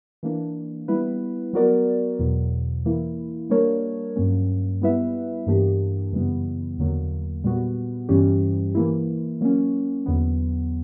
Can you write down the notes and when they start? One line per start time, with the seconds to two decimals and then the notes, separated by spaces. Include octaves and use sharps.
0.23 E3 A#3 D4
0.88 G3 B3 E4 B4
1.53 F#3 B3 F#4 A#4 D5
2.19 E2 B2 F#3
2.85 E3 A#3 E4
3.50 G3 A#3 D4 A#4 C#5
4.16 G2 F#3 A#3 C#4
4.82 G3 B3 E4 B4 E5
5.46 G2 E3 A#3 D4 G4
6.13 F#2 C#3 E3 G3 B3
6.78 E2 D3 F#3 A#3
7.44 A#2 G3 B3 F#4
8.09 G2 E3 G3 C#4 G4
8.75 E3 A#3 E4
9.41 F#3 A#3 C#4
10.06 E2 D3 F#3 B3